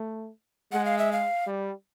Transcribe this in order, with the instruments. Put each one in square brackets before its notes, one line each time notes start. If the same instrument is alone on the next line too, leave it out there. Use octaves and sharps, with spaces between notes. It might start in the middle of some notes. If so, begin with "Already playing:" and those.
Already playing: [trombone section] A3
[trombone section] G#3 [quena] F#5
[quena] F5
E5
F5
[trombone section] G3